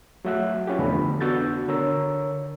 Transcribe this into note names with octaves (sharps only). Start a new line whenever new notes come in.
F#3 A3 E5 F#5 F#6
C#4 F4 G4
F2 D3 E3 A3 B3 B5
B3 D4 F#4 E6 G6 A6
D3 A#4 C#5 A#5 E6